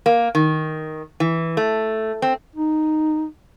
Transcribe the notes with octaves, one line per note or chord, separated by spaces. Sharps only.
A#3
D#3
E3
A3
C4
D#4